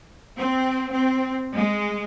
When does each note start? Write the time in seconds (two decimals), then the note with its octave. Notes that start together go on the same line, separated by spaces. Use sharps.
0.38 C4
0.93 C4
1.57 G#3